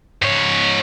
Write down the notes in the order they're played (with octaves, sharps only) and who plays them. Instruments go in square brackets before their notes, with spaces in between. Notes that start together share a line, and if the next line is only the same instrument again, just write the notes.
[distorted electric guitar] G#2 C#5